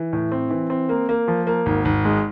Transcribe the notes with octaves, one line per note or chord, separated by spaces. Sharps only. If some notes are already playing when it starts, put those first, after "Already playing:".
Already playing: E3
A2
C4
E3
C4
A#3
A#3
F3
A#3
G#1
G#1
G#3